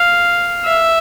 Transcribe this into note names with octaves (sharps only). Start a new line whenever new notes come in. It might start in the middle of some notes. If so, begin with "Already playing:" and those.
Already playing: F5
E5